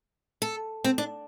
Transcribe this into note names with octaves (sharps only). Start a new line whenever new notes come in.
A4
C4
D4